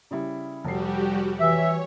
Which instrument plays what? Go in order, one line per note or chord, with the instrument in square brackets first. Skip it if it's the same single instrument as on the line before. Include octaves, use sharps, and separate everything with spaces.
[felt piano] C#3 G3 E4
[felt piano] F1 C7 [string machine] G3 F#4 G4
[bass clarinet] E3 [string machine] C#5 [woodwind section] E5